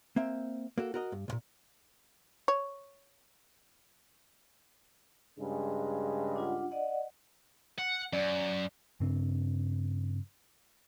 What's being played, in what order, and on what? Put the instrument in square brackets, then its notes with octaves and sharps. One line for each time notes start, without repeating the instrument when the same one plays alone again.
[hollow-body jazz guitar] A#3 C4 E5
A#3 F#4 A4
F#4 A#4 D#5
G2
C#2 A#2
[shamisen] C#5
[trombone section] G2 C#3 G#3
[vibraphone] D4 F4 F#5
D5 D#5 F#5
[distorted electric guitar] F#5
[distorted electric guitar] F#2 [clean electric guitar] D5
[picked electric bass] G2 C#3 C4 D4